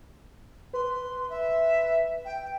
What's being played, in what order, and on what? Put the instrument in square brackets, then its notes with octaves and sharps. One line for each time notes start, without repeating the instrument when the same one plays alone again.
[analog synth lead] B4 [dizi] C6
[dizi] E5
G5